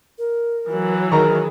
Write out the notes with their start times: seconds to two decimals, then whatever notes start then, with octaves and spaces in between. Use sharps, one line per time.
0.18 A#4
0.70 E3 F#3
1.12 D#3 G#4 A#4 A#5 C#6